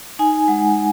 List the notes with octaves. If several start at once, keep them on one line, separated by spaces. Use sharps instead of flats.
D#4 G#5
G#3 F#5